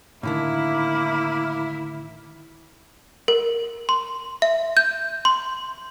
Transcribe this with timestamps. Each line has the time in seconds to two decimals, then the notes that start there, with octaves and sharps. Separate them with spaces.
0.23 A2 D3 D#3 A#3 E4
3.28 A#4
3.89 C6
4.42 E5
4.77 G6
5.25 C6